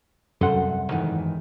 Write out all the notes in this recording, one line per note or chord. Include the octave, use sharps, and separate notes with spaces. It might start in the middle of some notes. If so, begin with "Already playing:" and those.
C2 F#2 A4 F#5 C6
G#2 D#3 E3